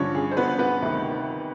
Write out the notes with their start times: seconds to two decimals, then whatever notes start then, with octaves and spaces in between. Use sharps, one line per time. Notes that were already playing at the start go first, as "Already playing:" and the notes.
Already playing: G2 D3 F3 C#4 C#5
0.15 G#4
0.31 C5
0.37 B3 B4
0.59 B3 B4
0.82 D2 C3 D#3